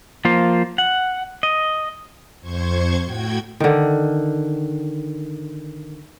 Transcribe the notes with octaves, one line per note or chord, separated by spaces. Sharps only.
F3 A#3 F4 C5
F#5
D#5
F2 C5 C#6 G#6
A2 F#4 G5 G#6
D3 D#3